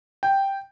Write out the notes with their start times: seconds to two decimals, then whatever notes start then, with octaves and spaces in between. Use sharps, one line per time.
0.23 G5